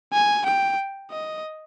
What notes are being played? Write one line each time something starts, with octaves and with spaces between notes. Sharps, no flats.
G#5
G5
D#5